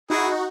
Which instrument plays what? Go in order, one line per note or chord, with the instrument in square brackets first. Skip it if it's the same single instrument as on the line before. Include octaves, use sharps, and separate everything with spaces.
[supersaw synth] D#4 F#4 [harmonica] E4 G#4